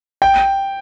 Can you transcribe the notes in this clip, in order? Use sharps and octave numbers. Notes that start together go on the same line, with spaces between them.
G5